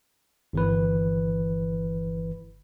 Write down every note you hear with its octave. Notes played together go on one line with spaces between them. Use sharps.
G1 E3 B4